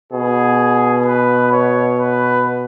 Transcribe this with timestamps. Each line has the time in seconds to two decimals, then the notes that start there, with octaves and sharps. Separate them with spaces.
0.12 B2 G#4
1.06 B4
1.52 C#5
1.99 B4